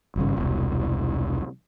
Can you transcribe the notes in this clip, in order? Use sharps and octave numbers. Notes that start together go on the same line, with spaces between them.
G#1 G2 C#3
E1 C2